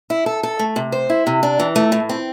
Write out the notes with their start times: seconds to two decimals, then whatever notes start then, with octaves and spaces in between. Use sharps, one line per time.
0.10 E4
0.26 A4
0.43 A4
0.59 A3
0.76 C3
0.92 C5
1.10 E4
1.27 C3
1.43 D4
1.60 E3
1.76 A3
1.92 A2
2.09 C4